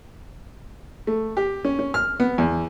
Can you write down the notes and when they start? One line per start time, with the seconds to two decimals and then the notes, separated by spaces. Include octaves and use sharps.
1.07 A3
1.37 G4
1.65 C#4
1.79 C#4
1.94 F6
2.20 B3
2.38 E2